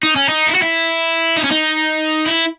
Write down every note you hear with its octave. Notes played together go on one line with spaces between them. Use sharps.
D#4
C#4
D#4
E4
F#4
E4
D#4
C#4
D#4
E4